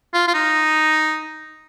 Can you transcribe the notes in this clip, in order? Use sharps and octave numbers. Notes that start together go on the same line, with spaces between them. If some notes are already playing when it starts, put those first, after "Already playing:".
F4
F4
D#4